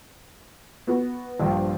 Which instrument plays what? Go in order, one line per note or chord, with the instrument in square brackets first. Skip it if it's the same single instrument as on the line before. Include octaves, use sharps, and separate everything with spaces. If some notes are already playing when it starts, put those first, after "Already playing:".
[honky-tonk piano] B3 F#4
[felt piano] A#1 G2 [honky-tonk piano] C5 F5 G5